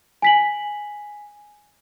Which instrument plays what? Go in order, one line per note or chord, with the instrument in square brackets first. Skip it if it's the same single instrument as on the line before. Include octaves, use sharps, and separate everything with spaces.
[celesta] G#5 B6 F#7